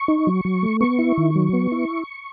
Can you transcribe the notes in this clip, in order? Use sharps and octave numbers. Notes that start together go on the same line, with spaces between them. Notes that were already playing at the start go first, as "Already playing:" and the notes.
Already playing: C#6
D#4
F#3
F#3
A3
B3 C#6
E4
D#3
F#3
B3
E4